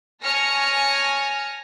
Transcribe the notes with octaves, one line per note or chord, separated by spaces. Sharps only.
C#5 G#5 A5 F6 A#6 C#7